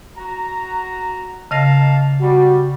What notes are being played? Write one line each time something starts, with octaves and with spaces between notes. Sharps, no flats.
F#4 A#5
C#3 A#3 D#5 F5 A5 A#6
G3 F#4